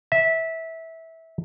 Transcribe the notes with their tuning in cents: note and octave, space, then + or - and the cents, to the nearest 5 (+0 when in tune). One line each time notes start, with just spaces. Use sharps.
E5 -15